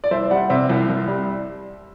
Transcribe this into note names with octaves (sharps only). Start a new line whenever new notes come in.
D5
C2 C5 E5
G3 D5 F#5
C3 C5 E5
C2
C2
G3